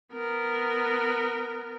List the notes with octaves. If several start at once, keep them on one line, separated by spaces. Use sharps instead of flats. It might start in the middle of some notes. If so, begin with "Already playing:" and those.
B3 A#4